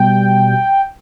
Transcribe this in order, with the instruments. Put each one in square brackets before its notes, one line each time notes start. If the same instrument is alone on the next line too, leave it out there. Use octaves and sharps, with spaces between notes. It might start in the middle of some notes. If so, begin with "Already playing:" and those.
Already playing: [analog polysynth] B2 G3 G5